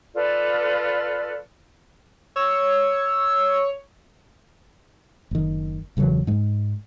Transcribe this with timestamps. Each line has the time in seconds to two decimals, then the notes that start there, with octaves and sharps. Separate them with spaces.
0.14 F4 A4 B4 D5
2.36 C#5 E6
5.31 F#1 D#3
5.97 E1 C#3 E3 F#3
6.27 G#2 G#3